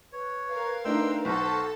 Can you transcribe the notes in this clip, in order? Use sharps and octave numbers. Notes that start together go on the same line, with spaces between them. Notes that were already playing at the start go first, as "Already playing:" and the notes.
B4 C#5
A#4 F5
A3 D4 D#4 G5 C6 E6
B1 F#4 A4 C5 A5